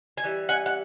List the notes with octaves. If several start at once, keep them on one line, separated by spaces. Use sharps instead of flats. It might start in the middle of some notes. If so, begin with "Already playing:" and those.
G#5
E3 G3
F#5 G#5
F#5